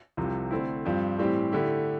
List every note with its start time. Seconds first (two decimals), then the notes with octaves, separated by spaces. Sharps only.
0.17 C2 C3 F3
0.51 D3 A3 C4 E4
0.85 G2 F3 C4 G4
1.18 A2 E3 G3 C4 G4
1.52 D3 A3 E4 G4